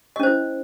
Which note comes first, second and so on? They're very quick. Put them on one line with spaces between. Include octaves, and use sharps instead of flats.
D#5 C#4 C5 E4